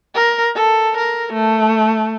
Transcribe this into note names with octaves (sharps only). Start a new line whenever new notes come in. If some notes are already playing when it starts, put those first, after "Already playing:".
A#4
A4
A#4
A3